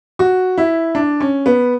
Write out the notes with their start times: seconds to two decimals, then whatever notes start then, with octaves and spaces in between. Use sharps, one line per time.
0.19 F#4
0.58 E4
0.95 D4
1.20 C#4
1.46 B3